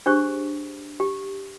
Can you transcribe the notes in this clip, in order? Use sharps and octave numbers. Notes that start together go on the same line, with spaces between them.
D4 G4 G#4 C5 C#6
G4